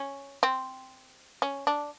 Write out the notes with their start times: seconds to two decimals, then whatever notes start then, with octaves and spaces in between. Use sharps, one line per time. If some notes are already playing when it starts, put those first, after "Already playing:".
Already playing: C#4
0.43 C4
1.42 C#4
1.67 D4